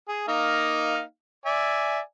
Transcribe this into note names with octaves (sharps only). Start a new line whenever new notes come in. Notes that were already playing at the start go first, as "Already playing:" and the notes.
G#4
A#3 D#4 F5
D5 E5 G#5